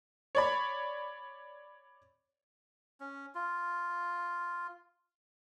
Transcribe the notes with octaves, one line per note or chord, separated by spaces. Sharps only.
C#5 D5 B5
C#4
F4